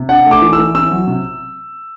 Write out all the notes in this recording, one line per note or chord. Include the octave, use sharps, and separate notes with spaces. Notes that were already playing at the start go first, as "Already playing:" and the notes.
Already playing: C3
D4 F#5
A3
D6
E3
E6
E3
C4 E6
F#3
C3